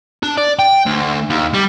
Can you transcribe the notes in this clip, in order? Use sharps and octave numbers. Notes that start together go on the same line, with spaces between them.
D4
D5
G5
D2
D#2
G3